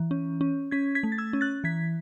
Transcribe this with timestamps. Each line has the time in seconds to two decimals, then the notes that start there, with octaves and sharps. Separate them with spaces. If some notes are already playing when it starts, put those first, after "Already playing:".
Already playing: E3
0.11 C#4
0.41 C#4
0.71 C#4 G#6 B6
0.95 G#6 B6
1.03 A3
1.12 A6
1.18 E6 G#6
1.33 C#4
1.41 F#6 A6
1.64 E3 G#6 B6